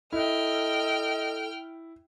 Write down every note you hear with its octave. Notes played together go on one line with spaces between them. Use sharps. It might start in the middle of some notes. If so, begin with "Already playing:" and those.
E4 A4 D#5 G5 F6